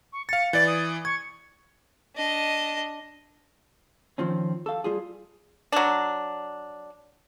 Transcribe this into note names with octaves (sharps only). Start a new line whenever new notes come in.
C#6
F5 A6 C#7
E3 D5 A6
D#6
C#6 G#6
D4 D#5
D#3 F3 C4 C#4
A4 F5
G3 F4 G#4
F#3 D4